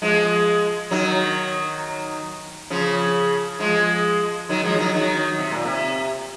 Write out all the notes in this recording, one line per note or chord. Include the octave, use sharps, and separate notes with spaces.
F3 G#3
D#3 F#3
C#3 F3
F3 G#3
D#3 F#3
F3 G#3
D#3 F#3
D#3 F#3
C3
A#2
C3